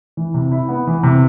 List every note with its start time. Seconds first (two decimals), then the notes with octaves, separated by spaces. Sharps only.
0.17 E3
0.34 C3
0.52 E4
0.69 B3
0.87 E3
1.03 C3